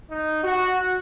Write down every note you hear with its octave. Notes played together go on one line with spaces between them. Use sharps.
D#4
F#4